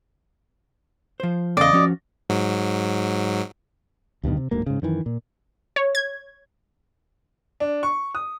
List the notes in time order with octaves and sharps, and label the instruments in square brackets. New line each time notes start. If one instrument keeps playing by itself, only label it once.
[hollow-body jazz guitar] F3 C5
[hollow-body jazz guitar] E2 C#3 F5 [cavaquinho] D5 D#5
[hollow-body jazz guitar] F3 C#4 F#4
[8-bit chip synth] G#2 F#3
[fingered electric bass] D2 G2 B2 D#3
C3
D1 D2 G#2 A#3
G#2 C#3
F#2 D#3 E3
A#2
[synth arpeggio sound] C#5
G#6
[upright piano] D4
C#6
D#6